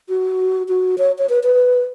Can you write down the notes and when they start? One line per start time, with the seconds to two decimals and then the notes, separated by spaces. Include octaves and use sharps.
0.09 F#4
0.68 F#4
0.98 C#5
1.18 C#5
1.29 B4
1.43 B4